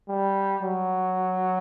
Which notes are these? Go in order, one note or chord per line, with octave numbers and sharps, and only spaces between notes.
G3
F#3